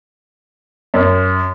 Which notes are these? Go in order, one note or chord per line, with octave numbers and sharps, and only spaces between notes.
F#2